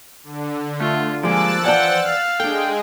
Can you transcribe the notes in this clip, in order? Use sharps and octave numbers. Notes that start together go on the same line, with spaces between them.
D3
A3 F4
F3 G3 G#3 A#3 D6 E6 F#6 A6
E3 D5 F#5 G5 A5
F5
G#3 D4 G#4 A4 G5